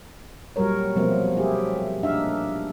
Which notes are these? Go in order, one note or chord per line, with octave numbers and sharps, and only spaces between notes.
A#2 F#3 G3 A#4 C#5
B2 F3 F#3 A3 A#3 C4
A3 E4 G4 G#4
A#2 D4 D#4 E5 F5